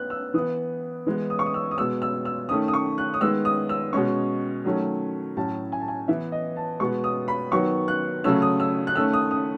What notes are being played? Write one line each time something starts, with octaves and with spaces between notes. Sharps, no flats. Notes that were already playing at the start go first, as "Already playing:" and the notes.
Already playing: B3 F#6
E6
E3 B3 D#6
E3 G#3 B3
D#6
C#6
D#6
E6
D#6
B2 G#3 B3 E6
E6
E6
D#3 A3 C#4 D#6
D#6
C#6
F#6
D#6
D#3 G#3 B3 E6
D#6
E6
B2 G#3 C#4 C#6
D#3 F#3 A3 C#4
A2 F#3 C#4 A5
G#5
A5
G#5
E3 B3 E5
D#5
A5
B2 G#3 B3 C#6
D#6
B5
D#3 F#3 B3 C#6
F#6
C#3 F#3 A3 C#4 E6
D#6
E6
F#6
D#3 A3 C#4 E6
D#6
D#6